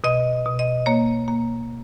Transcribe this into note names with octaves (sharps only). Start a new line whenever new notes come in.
B2 D#5
B2
D#5
A#3 C#5
A#3